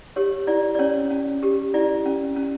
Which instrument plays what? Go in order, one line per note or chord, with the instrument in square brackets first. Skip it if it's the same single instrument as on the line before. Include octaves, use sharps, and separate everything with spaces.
[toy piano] G4 C#5
E4 D5
D5
C#4 C#5
C#4
G4
E4 D5
C#4
C#4